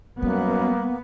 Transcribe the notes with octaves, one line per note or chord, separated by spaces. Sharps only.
F#2 G3 A#3 B3